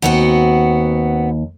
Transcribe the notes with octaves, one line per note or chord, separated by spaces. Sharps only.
D#2 B3 C4 F#4